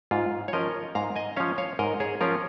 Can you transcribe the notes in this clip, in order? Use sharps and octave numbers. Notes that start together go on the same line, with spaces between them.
G#2 F4
C#5
F3 C#4 A#4 D#5
G#2 F5 A#5
D#5 G#5
F3 C#4 C#5 F5
C#5 F5
G#2 A#4 D#5
G#4 C#5
F3 C#4 F4 A#4